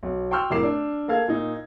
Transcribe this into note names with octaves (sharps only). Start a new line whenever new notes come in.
B1
G5 C6 C#6 E6 F6 G6
F1 A2 A#4 D6 C7 E7
D4
A#3 A4 F5 G#6
A#2 D#4